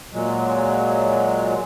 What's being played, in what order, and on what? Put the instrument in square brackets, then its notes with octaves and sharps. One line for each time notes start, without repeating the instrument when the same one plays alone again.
[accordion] A#2 F#3 G#3